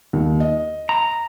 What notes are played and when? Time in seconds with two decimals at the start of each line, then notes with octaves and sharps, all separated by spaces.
0.13 D#2
0.40 D#5
0.89 A#5